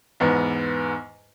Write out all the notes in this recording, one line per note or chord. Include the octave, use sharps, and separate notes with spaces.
E2 G#2 B3